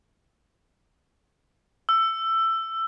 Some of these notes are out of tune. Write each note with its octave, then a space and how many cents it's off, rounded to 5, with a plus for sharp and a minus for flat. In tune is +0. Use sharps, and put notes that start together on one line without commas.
E6 +15